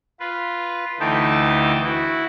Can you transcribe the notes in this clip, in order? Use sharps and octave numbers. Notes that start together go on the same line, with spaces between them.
F4 B4
D2 E3 A3 D#4 G5 A5
E4 F#4